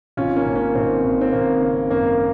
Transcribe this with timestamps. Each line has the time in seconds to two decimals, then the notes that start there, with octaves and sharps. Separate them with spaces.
0.17 G#1 C#4 F4
0.36 A#3 C#4
0.46 G#1
0.56 A#3 C#4
0.75 G#1 C4
1.04 G#1
1.21 C4
1.33 G#1 A#3
1.62 C#3
1.90 F#2 A#3